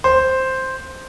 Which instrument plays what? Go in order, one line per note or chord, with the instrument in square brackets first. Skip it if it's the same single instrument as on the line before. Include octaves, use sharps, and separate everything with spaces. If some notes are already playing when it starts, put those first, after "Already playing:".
[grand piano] C5